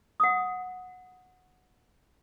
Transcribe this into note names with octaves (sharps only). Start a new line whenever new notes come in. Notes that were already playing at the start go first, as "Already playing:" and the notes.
F#5 D#6